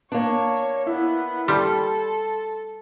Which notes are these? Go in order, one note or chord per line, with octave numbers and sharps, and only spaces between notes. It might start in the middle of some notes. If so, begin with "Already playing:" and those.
A#3 D4 C#5
B3 E4
G3 A4 C6